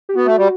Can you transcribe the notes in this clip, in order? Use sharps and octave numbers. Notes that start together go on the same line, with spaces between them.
G4
B3 F#4
A3
G3